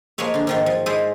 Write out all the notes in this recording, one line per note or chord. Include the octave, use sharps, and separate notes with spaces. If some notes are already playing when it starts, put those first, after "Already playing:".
F3 G#3 A#3 A#4 C#5 E5
D3 D4
G#2 D#3 F3
F3
G#3 E4 A#4 C5 D5 E5